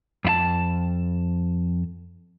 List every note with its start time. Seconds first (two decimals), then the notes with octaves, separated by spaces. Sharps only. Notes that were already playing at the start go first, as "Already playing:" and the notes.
0.25 F2 E4 A5